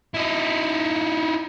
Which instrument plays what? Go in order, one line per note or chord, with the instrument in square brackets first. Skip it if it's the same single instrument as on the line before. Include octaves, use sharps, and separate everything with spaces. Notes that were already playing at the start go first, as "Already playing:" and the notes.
[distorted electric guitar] D#4 E4